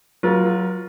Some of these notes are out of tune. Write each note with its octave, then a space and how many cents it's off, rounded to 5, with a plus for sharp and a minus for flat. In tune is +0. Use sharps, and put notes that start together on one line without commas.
F#3 +0 F4 +0 A#4 +45